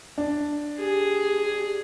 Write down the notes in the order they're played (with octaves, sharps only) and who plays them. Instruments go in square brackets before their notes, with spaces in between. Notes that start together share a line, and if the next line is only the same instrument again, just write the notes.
[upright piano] D4
[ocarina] G4 [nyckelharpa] G#4